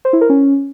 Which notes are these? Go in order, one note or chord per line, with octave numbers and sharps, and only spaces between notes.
C5
E4
A#4
C#4